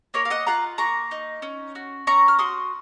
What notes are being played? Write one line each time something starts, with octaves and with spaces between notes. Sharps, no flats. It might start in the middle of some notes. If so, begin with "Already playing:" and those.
A#3 A#4 C#5
F5
D#5 F#5
F4 F#5 A#5
A#3 A#5 C#6
D#4
C#4
F#4
C#4 A#5 C#6
F6
F#4 C6 D#6